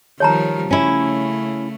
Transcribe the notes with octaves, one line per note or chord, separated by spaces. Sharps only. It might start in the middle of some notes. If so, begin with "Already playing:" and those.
D#3 F3 G3 C#5 A5 A#5
C#3 A3 C#4 E4